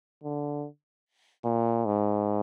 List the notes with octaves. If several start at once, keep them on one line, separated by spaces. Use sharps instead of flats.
D3
A#2
G#2